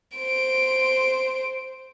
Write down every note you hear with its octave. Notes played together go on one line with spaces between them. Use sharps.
C5 D7